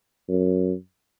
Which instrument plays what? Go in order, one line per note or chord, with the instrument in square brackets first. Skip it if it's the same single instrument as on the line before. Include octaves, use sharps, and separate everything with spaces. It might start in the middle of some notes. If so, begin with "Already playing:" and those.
[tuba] F#2